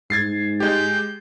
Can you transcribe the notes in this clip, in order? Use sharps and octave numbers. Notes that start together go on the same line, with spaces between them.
G#2 G#6 A6 C7
G#3 G4 G6